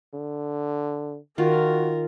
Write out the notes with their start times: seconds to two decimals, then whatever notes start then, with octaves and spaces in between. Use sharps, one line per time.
0.14 D3
1.38 D#3 F4 F#4 A#4